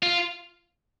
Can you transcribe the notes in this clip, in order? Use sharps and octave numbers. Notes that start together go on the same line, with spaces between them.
F4